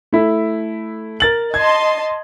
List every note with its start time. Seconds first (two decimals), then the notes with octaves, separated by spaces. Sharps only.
0.13 A3 E4
1.20 A#4 A6 F#7
1.54 D#5 A5 C6 G#6